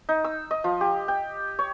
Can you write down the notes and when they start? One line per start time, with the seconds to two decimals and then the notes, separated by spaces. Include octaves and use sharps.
0.09 D#4
0.24 E6
0.51 D#5
0.64 F3
0.81 G4
1.08 G5
1.59 C#5